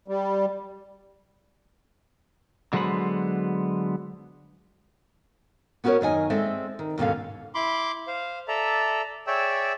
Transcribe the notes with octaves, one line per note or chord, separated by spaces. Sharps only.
G3
D3 F#3 G#3 B3 C5 B5
B3 C#4 F#4 G#4 A#4 C#5
F#2 D#3 D#5 G#5
G#3 C4 A4 D5 E5
D#3
D#2 G#2 B2 D3 C#4 F5
E4 B5 C6 D6
C5 F5
A4 D5 E5 A#5
G#4 C#5 D5 E5 G5 E6